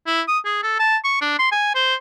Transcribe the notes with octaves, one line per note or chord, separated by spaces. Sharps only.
E4
D#6
G#4
A4
A5
C#6
D4
C6
G#5
C5